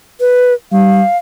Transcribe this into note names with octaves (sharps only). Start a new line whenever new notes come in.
B4
G3 F5